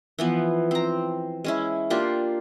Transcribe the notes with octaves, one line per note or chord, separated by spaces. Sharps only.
E3 F3 B3
C4 A#5
G#3 C#4 E4
A#3 D4 F4 G4